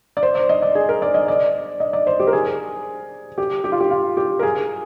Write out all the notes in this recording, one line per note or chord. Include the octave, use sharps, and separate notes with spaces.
D5
C5
D5
D#5
D5
G#4
A#4
D5
D#5
D5
D#5
D5
C5
G4
A#4
G#4
G4
G4
F4
G4
F4
G4
A#4
G#4